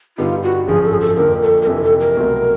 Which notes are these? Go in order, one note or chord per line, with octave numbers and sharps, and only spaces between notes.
G2 D3 G3 B3 D#4 F4
F#4
G#1 F#2 D3 F3 G#4
A4
G#4
A4
F2 D3 F3 A#3 A#4
A4
A#4
F2 C3 E3 A4
A4
A#4
C2 B2 F#3 A3 C4